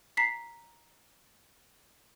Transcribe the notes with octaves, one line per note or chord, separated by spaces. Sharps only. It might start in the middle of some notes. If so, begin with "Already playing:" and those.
A#5 B6 C7